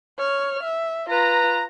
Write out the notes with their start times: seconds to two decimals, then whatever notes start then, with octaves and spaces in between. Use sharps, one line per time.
0.18 C#5 F6
0.64 E5
1.10 F4 B4 A#5